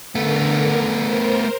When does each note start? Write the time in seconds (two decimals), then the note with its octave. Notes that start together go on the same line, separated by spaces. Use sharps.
0.15 D3 A3 B3 A#4
1.03 A#4 C5